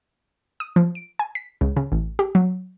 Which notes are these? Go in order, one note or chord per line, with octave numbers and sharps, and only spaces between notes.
D#6
F3
D7
G#5
B6
C#2
C#3
A1
G4
F#3